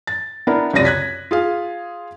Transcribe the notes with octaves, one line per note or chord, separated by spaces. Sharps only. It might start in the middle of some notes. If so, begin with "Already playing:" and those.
A6
B3 D4 E4 A#4
C#2 F#2 C3 D5 A#6 D#7
F#6 G#6 B6
F4 G#4 F5